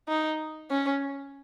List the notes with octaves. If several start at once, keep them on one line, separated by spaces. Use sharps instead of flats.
D#4
C#4